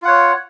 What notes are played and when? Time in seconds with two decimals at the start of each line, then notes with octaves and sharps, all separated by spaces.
0.02 F4
0.05 F#5
0.08 C#5